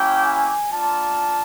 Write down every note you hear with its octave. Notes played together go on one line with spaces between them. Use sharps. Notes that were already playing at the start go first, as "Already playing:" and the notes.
Already playing: A#3 C#4 E4 G4 G5
G#5
A#3 D4 F4 A5